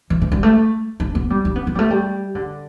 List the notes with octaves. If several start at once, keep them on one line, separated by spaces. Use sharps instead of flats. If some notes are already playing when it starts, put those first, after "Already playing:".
E3
E3
G3
A3
D4
B3
G3
D4
B3
B3
G3
A3
G3
D3